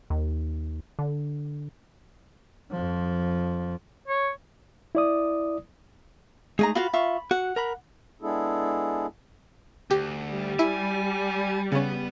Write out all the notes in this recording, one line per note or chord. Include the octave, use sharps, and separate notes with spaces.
D#2
D3
F2 F3
C#5
E4 D5 D#6
G#3 A3 D#4 G#4 D#5 A#5
F4 F#4 F5 B5
F4 E5 C#6
F#4 F#5
A#4 A#5 B5
G#3 B3 D4 E4 G#4 A4
D2 G4
G3
E4 G#5
C#3 B3 C#4